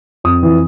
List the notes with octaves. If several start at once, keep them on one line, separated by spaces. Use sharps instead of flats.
F2 D#6
E3